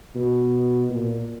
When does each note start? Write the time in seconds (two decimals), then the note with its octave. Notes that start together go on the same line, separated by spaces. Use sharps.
0.15 B2
0.89 A#2